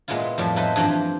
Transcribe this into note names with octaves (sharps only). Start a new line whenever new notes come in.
A#2 G#3 B3 E4 F4
F2 A2 G3
D#4 E4 A4 B4 C5 D#5
G2 E3 F3 C4 G4 A#5